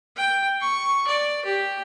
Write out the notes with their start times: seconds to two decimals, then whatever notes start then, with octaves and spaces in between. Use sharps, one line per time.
0.16 G5
0.61 C#6
1.07 D5
1.45 G4